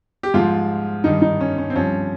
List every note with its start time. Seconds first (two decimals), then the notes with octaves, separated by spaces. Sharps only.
0.23 G4
0.34 G#2 F3 F4
1.04 G2 D#3 D#4
1.22 D#4
1.41 C#4
1.58 C#4
1.70 C4
1.75 G2 F3 C#4